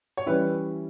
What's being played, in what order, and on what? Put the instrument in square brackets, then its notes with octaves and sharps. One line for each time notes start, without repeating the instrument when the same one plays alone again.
[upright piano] C#5
E3 G3 C#4 E4 B4